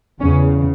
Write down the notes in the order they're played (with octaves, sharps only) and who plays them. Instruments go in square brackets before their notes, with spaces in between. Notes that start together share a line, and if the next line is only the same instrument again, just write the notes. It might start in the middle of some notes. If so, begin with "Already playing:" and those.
[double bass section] E2 C#3 C#4